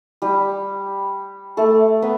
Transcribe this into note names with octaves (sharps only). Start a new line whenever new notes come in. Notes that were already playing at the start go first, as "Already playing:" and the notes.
G3 G4
A3 A4
B3 B4